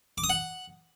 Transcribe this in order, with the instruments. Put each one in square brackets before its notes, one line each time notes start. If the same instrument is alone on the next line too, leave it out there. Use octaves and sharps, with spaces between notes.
[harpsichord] D6
D#6
F#5